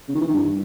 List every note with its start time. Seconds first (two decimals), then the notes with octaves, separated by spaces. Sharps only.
0.09 C#3
0.15 D#3
0.21 E3
0.28 D#3
0.34 G2